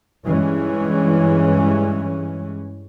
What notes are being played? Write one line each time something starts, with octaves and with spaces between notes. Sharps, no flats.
G2 E3 G#3 C#4